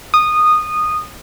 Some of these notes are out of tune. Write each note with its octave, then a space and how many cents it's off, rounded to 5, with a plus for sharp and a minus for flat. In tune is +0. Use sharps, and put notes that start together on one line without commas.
D#6 -15